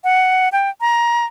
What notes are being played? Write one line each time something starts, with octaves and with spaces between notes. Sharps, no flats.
F#5
G5
A#5